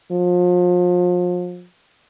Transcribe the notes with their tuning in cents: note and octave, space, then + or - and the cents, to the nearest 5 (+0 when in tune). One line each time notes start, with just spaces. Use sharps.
F3 +35